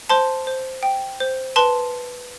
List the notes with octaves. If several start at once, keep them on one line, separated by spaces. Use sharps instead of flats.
C5 A5 C6
C5
G5
C5
B4 A5 C6